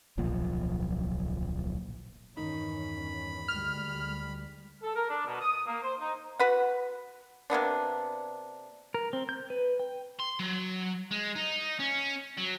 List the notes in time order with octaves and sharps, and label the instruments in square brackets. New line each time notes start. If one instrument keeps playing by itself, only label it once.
[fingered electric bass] D1 B1 A#2 F3
[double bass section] E2 G2 C#4 [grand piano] D#3 D#4 [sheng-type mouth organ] B5
[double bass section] D2 G3 G#3 [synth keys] F6
[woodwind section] A4
A#4
D4
B2
D#6
D#6
A#3
C5
D#4
[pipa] F#4 B4 F#5
C3 A#3 B3 D4
[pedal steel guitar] A#4
C4
G6
B4
G5
[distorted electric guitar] C6
F#3
G#3
D#4
C#4
F#3